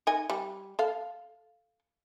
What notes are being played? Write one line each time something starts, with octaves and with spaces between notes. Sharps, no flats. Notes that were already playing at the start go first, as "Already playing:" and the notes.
D#4 D#5 G#5
G3
A4 F5